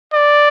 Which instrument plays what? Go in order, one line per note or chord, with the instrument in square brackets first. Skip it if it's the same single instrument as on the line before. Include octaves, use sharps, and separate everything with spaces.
[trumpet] D5